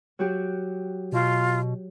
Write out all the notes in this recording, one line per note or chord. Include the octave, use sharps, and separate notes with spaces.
F#3 F#4 G4
B2 F4